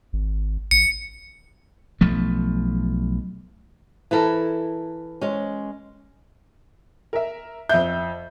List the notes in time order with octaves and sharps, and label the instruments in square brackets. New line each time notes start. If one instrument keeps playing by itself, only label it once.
[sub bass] G#1
[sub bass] A1 [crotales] C#7
[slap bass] B1 F3 A3
[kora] E3 E4 A4 A#4
G#3 C#4
[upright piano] A#4 E5
[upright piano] F2 G6 [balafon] E5